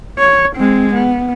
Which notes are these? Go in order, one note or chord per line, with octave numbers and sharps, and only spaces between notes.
C#5
G#3 C4
B3